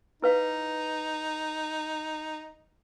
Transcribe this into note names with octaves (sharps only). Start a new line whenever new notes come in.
D#4 E4 B4 F5